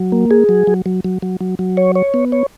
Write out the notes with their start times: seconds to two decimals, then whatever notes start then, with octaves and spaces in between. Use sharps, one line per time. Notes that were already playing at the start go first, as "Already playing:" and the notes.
Already playing: F#3
0.12 A#3
0.31 G#4
0.49 F#3
0.67 F#3
0.86 F#3
1.04 F#3
1.22 F#3
1.41 F#3
1.59 F#3
1.77 C#5
1.96 C#5
2.14 B3
2.32 C#5